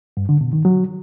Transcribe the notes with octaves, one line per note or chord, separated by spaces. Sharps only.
G2
D3
B2
D#3
F#3